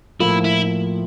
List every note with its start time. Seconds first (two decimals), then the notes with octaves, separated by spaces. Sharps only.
0.20 A2 F3 A#3 E4 F4
0.44 E4